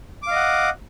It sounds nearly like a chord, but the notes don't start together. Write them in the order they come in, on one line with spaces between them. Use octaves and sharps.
D6 F5 D#5 F#5